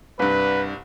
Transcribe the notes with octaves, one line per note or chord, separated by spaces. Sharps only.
C2 G2 B4